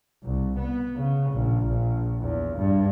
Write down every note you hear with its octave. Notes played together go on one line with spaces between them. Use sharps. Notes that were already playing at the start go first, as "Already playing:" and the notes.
C2
B3
C#3
A#1
A#1
E2
G2